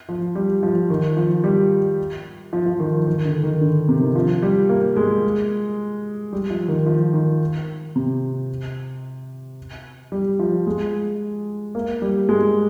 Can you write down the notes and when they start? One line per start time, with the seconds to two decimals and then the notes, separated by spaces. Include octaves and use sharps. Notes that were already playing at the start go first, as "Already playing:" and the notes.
0.09 F3
0.35 G3
0.63 F3
0.90 D#3
1.17 F3
1.44 G3
2.53 F3
2.66 F3
2.80 D#3
2.93 F3
3.07 D#3
3.25 D3
3.43 D#3
3.61 D3
3.89 C3
4.02 D#3
4.15 F3
4.42 G3
4.69 A#3
4.97 G#3
6.33 G3
6.50 F3
6.68 D#3
6.86 F3
7.13 D#3
7.96 C3
10.12 G3
10.39 F3
10.67 G#3
11.75 A#3
12.02 G3
12.29 G#3